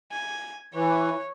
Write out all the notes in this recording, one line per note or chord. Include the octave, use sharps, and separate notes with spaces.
G#5
E3 C#5